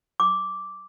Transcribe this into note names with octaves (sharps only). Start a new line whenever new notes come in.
D6